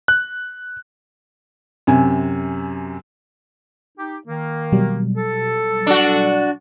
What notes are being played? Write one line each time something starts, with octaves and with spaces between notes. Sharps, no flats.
F#6
F#2 C3 G#5
D#4 G4
D#3 A#3
B2 F#3 G3
A4
D4 F#4